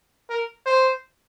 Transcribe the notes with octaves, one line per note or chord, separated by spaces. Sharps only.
A#4
C5